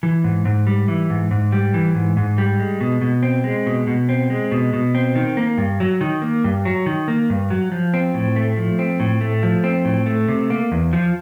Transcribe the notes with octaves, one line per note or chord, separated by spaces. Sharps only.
E3
G#2
G#2
G3
E3
G#2
G#2
G3
E3
G#2
G#2
G3
G#3
B2
B2
C4
G#3
B2
B2
C4
G#3
B2
B2
C4
D#3
A#3
G2
F#3
D#3
A#3
G2
F#3
D#3
A#3
G2
F#3
F3
C4
A2
A3
F3
C4
A2
A3
F3
C4
A2
A3
C3
A#3
E2
F3